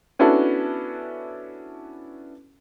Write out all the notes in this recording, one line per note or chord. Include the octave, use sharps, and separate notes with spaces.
B3 C#4 D4 E4 F#4 A4